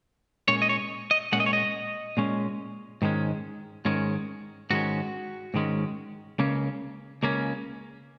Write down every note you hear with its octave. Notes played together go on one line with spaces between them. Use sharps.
A#2 G#3 C#4 C#5
D#5
C#5
D#5
A#2 G#3 C#4 F#5
D#5
C#5
D#5
A#2 G#3 C#4
G#2 D#3 G#3 C#4
G#2 D#3 G#3 C#4
G#2 D#3 G#3 C#4 F#4
G#2 D#3 G#3 C#4
C#2 C#3 A#3 C#4
C#2 C#3 A#3 C#4